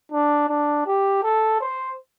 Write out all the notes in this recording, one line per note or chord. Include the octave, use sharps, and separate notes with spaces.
D4
D4
G4
A4
C5